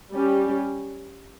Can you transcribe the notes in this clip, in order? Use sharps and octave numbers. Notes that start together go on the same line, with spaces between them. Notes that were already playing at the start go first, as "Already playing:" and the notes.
G3 C#4 G4